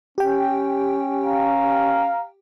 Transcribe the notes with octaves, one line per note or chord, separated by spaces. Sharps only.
C#4 G4 G5
F5 A#5